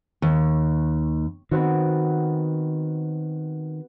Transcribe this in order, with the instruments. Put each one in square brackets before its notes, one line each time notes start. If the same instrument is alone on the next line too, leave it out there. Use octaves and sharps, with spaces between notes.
[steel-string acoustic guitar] D#2
[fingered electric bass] D#3 [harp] B3 C4 F#4